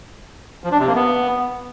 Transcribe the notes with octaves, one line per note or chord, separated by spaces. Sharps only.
F3
D4
C3
A#3
B3